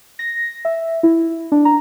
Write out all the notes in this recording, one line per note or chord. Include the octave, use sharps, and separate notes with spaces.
A#6
E5
E4
D4
A#5